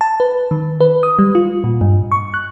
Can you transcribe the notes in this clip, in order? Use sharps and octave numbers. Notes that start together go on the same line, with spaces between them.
A5
B4
D#3
B4
D#6
G3
F4
A#2
G2
C#6
F#6